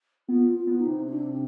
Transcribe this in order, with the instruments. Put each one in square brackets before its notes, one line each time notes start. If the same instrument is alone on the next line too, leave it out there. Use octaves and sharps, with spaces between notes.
[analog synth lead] B3 [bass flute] F4
[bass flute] F4
[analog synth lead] B3
[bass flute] F4
D#4
[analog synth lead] C3
[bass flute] D4
C4